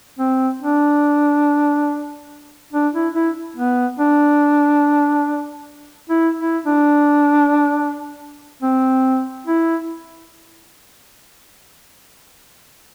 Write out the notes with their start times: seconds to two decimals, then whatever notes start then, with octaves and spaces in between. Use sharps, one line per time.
0.19 C4
0.62 D4
2.73 D4
2.94 E4
3.15 E4
3.57 B3
4.00 D4
6.10 E4
6.39 E4
6.66 D4
8.62 C4
9.47 E4